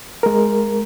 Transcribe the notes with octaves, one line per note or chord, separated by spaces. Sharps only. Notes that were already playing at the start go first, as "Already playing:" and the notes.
G#3 A#4